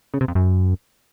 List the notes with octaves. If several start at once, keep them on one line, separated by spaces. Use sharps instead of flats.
C#3
C3
F2
F#2